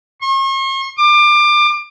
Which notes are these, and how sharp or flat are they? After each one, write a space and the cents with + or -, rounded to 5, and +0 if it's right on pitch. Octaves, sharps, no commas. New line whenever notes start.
C#6 -45
D6 +25